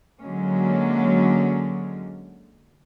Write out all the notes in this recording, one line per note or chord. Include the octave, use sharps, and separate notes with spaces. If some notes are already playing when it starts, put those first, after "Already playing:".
D3 F#3 G#3 A#3 C#4